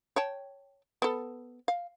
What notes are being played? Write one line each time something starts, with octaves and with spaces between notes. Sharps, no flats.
C#5 G5 A5
B3 A4
F5